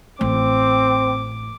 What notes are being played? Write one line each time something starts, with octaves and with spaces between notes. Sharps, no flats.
A1 C4 D6